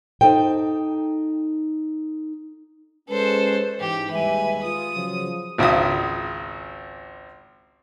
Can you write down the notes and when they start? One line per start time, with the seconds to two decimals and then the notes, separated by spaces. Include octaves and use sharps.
0.21 D#4 A4 C5 G5
3.09 G#3 C#4 A4 B4 C5
3.80 G#2 E3 G4
4.11 D#2 G3 G#3 B4 E5 G#5
4.64 F4 D#6
4.94 C#3 F3 F#3
5.58 G#1 C#2 E5 D#6